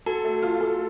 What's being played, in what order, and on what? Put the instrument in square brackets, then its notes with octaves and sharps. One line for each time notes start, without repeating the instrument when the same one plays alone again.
[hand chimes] F#4 [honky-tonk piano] A4
[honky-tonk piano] A3
F4
A4